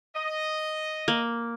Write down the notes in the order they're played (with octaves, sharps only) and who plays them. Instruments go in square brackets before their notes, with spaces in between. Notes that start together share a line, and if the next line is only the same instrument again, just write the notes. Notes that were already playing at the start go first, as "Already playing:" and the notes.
[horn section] D#5
[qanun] A#3